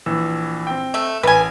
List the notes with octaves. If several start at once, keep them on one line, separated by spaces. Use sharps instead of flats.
A#1 E3 E6
C4 G5
A3 E5
A1 B4 G#5